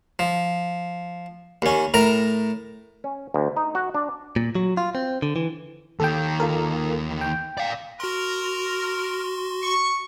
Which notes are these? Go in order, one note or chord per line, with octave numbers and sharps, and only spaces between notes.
F3
D#2 C#4
A2 A#4 A#5
C#4
D2
D#4
F#4
D4
A#2
F#3
F4
C4
D3
E3
D#2 D#3 A4 G5
F4 A4 A#4
G5
D5 F5
F#4 A#4 C6
C#6